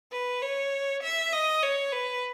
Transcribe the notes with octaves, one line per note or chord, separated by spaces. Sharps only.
B4
C#5
E5
D#5
C#5
B4